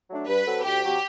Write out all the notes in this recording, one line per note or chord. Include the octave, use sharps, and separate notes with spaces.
F#3 A3 D4
G2 B4
F#3 C4 F#4 A4
D2 G4
C3 F#3